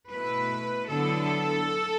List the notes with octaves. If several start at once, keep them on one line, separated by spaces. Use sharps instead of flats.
B2 A3 E4 B4
D3 F#3 B3 E4 A4